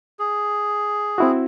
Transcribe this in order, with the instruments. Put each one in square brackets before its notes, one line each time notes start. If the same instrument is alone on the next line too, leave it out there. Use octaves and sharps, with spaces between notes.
[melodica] G#4
[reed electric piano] C4 E4 F#4